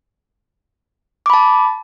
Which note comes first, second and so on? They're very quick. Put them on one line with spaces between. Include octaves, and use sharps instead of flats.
D6 B5 A5